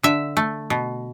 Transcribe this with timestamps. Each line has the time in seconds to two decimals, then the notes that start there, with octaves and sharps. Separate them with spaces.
0.03 D3 E5
0.37 A3
0.70 B2